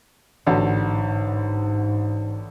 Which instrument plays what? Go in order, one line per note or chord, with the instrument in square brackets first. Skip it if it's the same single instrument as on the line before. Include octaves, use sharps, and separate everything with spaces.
[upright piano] A1 D3 F#4 [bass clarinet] G#2